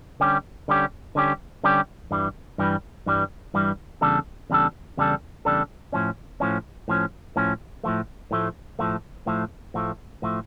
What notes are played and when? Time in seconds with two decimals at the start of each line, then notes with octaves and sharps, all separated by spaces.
0.20 D3 G3 C#4 G4
0.68 D3 G3 C#4 G4
1.15 D3 G3 C#4 G4
1.64 D3 G3 C#4 G4
2.11 G2 E3 G3
2.58 G2 E3 G3
3.06 G2 E3 G3
3.54 G2 E3 G3
4.01 E2 C#3 G3 D4 A4
4.50 E2 C#3 G3 D4 A4
4.97 E2 C#3 G3 D4 A4
5.45 E2 C#3 G3 D4 A4
5.92 A2 F3 C#4
6.40 A2 F3 C#4
6.88 A2 F3 C#4
7.36 A2 F3 C#4
7.84 A2 F3 A3
8.31 A2 F3 A3
8.79 A2 F3 A3
9.27 A2 F3 A3
9.74 A2 F3 A3
10.22 A2 F3 A3